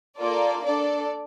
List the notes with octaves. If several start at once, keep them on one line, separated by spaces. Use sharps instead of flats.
A#3 F4 A4 D5
D4 A4 D5